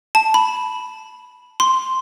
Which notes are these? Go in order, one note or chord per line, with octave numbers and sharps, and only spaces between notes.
A5
B5
C6